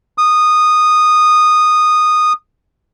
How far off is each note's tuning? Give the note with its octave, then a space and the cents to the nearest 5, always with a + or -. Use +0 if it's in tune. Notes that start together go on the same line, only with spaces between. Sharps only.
D#6 -15